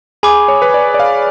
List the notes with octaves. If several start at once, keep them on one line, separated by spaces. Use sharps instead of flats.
G#4 G#5 B5 D6
C#5
B4
D5
D5
F5